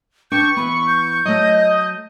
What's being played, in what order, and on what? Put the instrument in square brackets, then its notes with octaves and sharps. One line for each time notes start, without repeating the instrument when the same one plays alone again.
[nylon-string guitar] D4 B4 G5 [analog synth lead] C#6 [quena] G6
[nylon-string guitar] E3 B3 [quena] B5
[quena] G6
[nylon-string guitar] F#3 A3 [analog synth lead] D#5